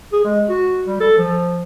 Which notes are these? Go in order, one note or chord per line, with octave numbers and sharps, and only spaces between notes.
G#4
G#3
F#4
G3
A4
F3